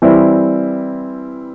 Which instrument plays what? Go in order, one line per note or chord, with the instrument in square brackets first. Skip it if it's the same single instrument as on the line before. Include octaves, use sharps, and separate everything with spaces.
[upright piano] E3 G3 C4 E4